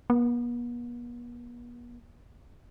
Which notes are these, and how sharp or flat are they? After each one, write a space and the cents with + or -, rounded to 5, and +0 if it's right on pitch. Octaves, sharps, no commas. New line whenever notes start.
B3 -45